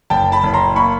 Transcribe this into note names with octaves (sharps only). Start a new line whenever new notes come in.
F#1 G5 A5
A5 B5
F#1
A#5 C6
A#3 B5 C#6